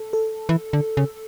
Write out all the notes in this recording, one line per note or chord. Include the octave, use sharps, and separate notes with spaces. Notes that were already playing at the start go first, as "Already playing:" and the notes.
Already playing: A4
A4
E3
D3
C#3